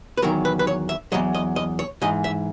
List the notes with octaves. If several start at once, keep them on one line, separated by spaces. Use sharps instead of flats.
B4
E2 D#3 F#3 A#4
B4
B4
C#5
E5
E2 D#3 F#3 D#5
D#5
D#5
C#5
G#2 E3 D#5
E5